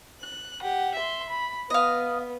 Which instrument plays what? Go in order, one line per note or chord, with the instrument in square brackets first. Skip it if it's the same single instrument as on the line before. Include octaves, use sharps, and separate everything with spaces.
[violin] F#6
G4 F#5
E5 C6
B5
[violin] B3 [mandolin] D#5 F5